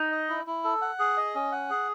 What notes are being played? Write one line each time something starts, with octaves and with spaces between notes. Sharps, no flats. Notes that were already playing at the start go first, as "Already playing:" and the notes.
Already playing: D#4
D#5
E4
E4
A4
F#5
G#4
D#5
C#4
F#5
G#4